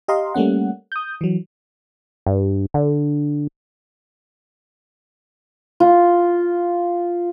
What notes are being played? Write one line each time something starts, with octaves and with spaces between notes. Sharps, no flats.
G4 D#5 F5 A#5 C6
G3 A3 A#3 C#4 F#5
D#6 G6
E3 F#3
G2
D3
F4